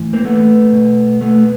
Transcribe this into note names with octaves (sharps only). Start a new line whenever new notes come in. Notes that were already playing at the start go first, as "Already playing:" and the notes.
Already playing: A2 E3
A#3 C4
A3 B3
B2
A3 B3